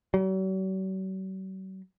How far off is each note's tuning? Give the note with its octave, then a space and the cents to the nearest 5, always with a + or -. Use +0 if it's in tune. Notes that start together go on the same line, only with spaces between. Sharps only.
F#3 +45